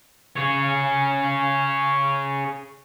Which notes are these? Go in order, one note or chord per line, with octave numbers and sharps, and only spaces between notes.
G#4 C#5